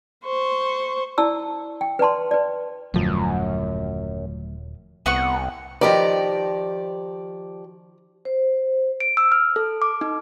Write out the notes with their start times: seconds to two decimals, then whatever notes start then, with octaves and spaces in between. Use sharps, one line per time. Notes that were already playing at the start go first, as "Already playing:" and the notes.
0.25 C5 C#6
1.18 E4 D5 A5 E6
1.81 G5
1.99 B4 D5 A5 C6
2.31 B4 D5
2.94 D#1 F#2 D3 F3 F#3 A3
5.06 C2 B3 F#5 C#6
5.81 D#3 F3 G4 B4 D5 D#5
8.25 C5
9.00 D7
9.17 E6
9.32 F6
9.56 A4
9.82 D6
10.01 D#4